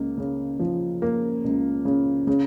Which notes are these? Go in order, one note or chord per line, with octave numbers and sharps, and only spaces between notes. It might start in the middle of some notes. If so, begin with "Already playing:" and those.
Already playing: C#2 A#3
C#3
F3
A#3
C#2
C#3
C#3